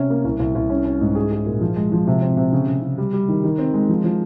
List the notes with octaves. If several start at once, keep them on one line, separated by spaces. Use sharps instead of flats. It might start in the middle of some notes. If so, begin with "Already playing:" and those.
Already playing: C3 C#4
A#3
C2
C2
C2
C#4
C#4
G#2
G#4
G#4
A#2
F3
G#3
F3
C3
C4
C3
C#3
C#3
C#3
G3
G3
D#3
D#3
C4
G#3
F3
F3